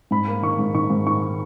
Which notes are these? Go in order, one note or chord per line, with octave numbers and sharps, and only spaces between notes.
G#2 B5
A#3
D#3 C#6
G#2
D#3 C#6
G#2
D#3 C#6